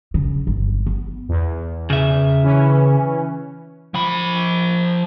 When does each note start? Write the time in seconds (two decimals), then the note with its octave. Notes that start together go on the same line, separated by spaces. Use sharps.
0.14 C#3
0.47 G1
0.86 B3
1.29 E2
1.90 C#3 E5
2.43 E3 C#4
3.94 F3 B5